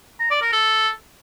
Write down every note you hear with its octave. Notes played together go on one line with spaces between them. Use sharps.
A#5
D5
A#4
A4